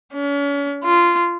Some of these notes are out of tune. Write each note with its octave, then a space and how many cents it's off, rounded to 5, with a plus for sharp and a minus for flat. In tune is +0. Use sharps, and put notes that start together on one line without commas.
C#4 +40
F4 -15